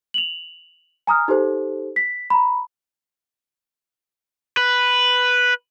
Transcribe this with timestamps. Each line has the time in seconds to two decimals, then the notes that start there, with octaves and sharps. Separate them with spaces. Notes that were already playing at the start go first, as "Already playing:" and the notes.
0.14 F7 F#7
1.07 G#5 A#5 D#6 F6
1.28 D#4 G4 A4 C5
1.96 B6
2.30 A#5 B5
4.57 B4